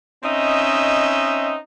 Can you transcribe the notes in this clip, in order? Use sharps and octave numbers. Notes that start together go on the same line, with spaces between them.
C4 C#4 D#4 D#5 E5